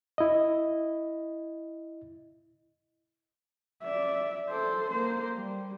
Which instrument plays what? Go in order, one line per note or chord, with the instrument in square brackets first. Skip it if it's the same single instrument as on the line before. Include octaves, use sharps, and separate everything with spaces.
[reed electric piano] E4 D#5
[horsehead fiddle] D5 E5
A4 C5
A#3 C5
G3